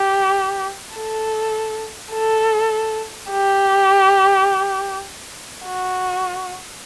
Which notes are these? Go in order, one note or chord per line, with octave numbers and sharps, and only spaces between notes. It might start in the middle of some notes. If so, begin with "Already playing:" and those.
Already playing: G4
A4
A4
G4
F#4